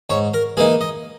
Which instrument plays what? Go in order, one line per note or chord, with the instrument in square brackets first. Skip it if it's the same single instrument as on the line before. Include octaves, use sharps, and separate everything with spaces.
[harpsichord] G#2 C#5
A#4
E3 A#3 D#4 G#4
D#5